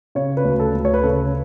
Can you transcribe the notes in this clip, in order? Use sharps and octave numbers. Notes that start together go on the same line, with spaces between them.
C#3 C#5
B4
D2
A4
D2
C#5
B4
C#3 A4